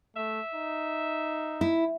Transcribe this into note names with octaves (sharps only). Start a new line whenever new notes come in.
A3 E5
D#4
E4